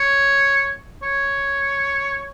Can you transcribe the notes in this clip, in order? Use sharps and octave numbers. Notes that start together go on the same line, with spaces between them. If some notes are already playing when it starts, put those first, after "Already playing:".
Already playing: C#5
C#5